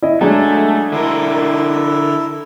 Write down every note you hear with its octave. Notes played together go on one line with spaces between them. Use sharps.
E4 D#5
F#3 G#3 A3 D4 G#4 A4
D3 E4 A#4